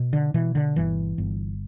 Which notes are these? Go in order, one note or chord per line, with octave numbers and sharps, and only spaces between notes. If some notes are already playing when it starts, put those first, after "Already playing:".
Already playing: B2
D3
B2 E3
D3
G1 E3
G1